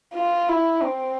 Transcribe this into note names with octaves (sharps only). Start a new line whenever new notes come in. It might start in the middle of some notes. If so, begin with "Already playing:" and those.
F4
E4
C4